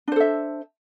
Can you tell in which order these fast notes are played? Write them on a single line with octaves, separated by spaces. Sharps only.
D4 C5 A4 E5